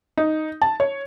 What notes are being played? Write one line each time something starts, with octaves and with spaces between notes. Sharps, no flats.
D#4
A5
C#5